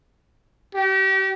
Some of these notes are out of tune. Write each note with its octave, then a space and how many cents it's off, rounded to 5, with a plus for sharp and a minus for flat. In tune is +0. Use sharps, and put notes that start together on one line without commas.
G4 -35